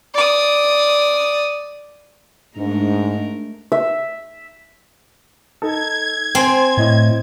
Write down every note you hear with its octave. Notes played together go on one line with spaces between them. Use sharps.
D5 D#6
G#2 G#3 A3 D4 A#4
E5
D#4 A4 G#6
C4 G5 G#5 C6
A2 D#5